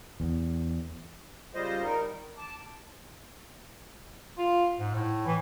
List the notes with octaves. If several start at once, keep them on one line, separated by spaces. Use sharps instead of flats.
E2
C#3 G3 F4 C5 D#5
G3 D#4 A#4
D#3
A5 D6
F4
G#2
A2
E3